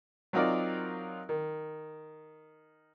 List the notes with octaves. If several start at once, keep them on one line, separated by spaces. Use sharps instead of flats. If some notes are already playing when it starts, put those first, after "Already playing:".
F#3 C4 D#4 F4 A#4 D5
D#3